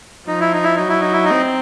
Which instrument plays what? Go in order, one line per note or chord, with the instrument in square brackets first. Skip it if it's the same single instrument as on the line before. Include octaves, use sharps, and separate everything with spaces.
[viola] F3 [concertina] D#4
[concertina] E4
D#4
E4
[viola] F#3 [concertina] D#4
[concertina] E4
D#4
E4
D#4
[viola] C4